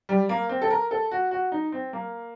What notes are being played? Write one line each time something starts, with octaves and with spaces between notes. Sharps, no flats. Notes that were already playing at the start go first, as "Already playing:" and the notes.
G3
A#3
C4
A4
A#4
A4
F#4
F#4
D#4
C4
A#3